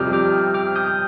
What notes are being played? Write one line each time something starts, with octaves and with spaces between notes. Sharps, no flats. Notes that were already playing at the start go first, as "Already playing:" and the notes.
Already playing: F2 C3 G3 D6 D#6 F6 G6
D6 F6
D6 F6
D#6 G6